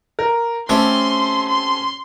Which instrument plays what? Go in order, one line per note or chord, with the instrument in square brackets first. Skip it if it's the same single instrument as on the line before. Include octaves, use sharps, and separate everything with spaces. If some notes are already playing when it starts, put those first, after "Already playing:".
[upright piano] A#4
[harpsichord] A3 C4 G4 [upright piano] C#4 [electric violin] C6
[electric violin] C6